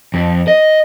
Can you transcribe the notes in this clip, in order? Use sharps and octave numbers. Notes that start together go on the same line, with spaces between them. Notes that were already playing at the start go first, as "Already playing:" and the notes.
F2
D#5